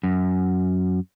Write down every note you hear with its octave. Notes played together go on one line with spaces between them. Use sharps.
F#2